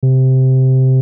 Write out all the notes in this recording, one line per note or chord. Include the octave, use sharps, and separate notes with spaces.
C3